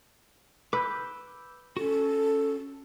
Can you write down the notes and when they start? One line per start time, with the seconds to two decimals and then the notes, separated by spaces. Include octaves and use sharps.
0.73 B4 D6 E6 G6
1.77 C#4 F#4 A4